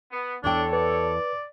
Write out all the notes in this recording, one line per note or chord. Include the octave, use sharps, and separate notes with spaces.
B3
E2 D4 A4 C#5 G5
B4 D5